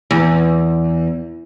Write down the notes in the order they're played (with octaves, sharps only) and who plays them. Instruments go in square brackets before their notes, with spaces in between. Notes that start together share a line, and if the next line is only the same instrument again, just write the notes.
[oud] E2